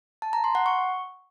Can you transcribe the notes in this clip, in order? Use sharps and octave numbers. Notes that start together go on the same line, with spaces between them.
A5
A#5
C6
F#5
C#6